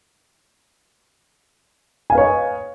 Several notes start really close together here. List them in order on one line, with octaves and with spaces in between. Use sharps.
G#5 F5 B4 C#5 D#5